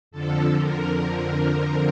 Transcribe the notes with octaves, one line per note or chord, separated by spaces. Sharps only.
F2 D3 F3 A4
A#4